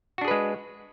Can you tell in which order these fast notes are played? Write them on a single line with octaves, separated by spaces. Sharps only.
F#4 D4 G#4 B4 G#3